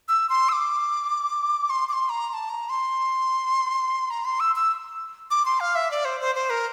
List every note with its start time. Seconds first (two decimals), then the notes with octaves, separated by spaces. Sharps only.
0.09 E6
0.29 C6
0.49 E6
0.53 D6
1.70 C6
1.89 D6
1.93 C6
2.09 A#5
2.29 A#5
2.34 A5
2.50 A#5
2.69 C6
4.10 A#5
4.25 C6
4.40 E6
4.56 E6
5.31 D6
5.46 C6
5.60 F5
5.75 E5
5.91 D5
6.05 C5
6.21 C5
6.35 C5
6.50 A#4